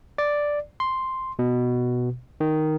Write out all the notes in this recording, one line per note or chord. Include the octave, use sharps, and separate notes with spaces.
D5
C6
B2
D#3